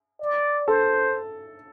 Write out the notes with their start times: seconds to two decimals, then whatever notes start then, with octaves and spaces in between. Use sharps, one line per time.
0.20 D5
0.68 A4 C5